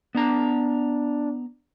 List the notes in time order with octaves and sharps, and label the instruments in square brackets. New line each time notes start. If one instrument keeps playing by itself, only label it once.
[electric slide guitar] B3 A#5 [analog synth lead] D4